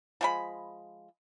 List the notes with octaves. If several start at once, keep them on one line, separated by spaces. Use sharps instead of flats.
F3 G#3 B5